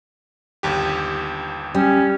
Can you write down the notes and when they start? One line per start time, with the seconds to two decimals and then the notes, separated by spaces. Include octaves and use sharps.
0.63 G1 D#2 G4
1.75 G3 C#4